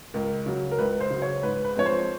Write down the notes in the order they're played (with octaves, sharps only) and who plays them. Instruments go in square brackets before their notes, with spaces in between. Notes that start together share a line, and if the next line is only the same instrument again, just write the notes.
[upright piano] C#2 [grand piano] A#4
[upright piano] C#3 F#3
[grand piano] A#4
[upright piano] C#2 [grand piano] B4
[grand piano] C5
[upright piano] C#3 F#3
[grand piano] C#5
[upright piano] G#2 [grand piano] B4
[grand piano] B4
[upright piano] F3 G#3 C4 [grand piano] C#5
[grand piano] C5